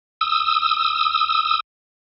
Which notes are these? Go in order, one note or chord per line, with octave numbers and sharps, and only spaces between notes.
D#6 E6